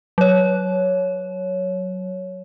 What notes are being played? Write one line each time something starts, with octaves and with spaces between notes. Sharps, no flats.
F#3 C#5